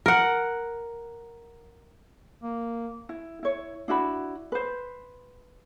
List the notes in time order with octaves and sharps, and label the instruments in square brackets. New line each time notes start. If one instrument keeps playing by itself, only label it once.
[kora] A#4 F#5
[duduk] A#3
[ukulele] E4
E4 C#5
D4 E4 F#4 B5
B4 C5